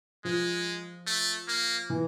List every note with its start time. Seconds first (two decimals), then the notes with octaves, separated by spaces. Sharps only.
0.24 F3 G#3
1.07 A3
1.48 A#3
1.90 E3